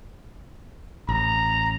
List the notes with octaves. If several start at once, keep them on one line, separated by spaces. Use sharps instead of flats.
A1 A#5